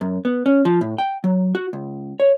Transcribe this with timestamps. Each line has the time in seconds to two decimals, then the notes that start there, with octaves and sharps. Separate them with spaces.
0.01 F#2
0.25 B3
0.46 C#4
0.65 F3
0.81 A2
0.98 G5
1.24 F#3
1.55 F#4
1.73 C#2
2.20 C#5